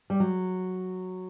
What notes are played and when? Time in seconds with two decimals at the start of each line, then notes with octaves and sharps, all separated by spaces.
0.10 G3
0.20 F#3